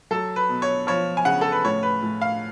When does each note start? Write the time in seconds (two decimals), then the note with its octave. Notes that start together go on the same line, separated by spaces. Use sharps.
0.11 F#3 A4
0.36 B4
0.49 B2
0.62 C#5
0.87 F3 C#5
1.17 G#5
1.25 C#3 F#5
1.41 A4
1.52 B4
1.64 A2 C#5
1.83 B4
2.03 A2
2.21 F5